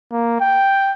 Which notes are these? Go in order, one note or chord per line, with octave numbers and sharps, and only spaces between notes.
A#3
G5